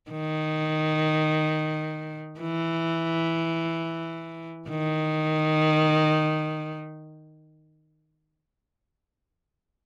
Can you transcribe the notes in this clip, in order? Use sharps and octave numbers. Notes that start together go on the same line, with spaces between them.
D#3
E3
D#3